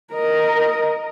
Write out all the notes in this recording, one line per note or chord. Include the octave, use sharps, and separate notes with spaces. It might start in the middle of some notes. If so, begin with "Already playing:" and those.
A#4 D#5